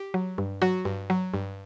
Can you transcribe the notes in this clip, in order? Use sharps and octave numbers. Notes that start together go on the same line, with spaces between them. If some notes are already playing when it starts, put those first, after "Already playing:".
Already playing: G4
F#3
G2
F#3 F#4
G2
F#3
G2